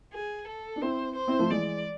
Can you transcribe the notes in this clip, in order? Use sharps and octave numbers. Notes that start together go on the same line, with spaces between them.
G#4
A4
D4
C4 E4 C5
C5
C4 E4
F3 A3
E3 G#3 D5